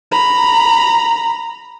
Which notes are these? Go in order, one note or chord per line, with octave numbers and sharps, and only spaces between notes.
A#5 B5